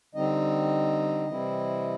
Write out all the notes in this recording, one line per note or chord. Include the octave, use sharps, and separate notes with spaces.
D3 G3 C4 D#4 D#5
C3 E3 G3 C4 E4